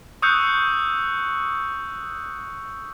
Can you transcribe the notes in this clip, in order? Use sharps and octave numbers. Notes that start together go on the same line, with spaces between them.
C#6 D#6 E6 F#6 G6 C#7